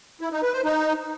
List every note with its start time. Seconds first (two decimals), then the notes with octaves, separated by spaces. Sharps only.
0.21 E4
0.32 D#4
0.43 B4
0.54 C5
0.64 D#4